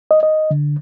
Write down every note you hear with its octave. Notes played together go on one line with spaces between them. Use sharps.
D#5
D#5
D3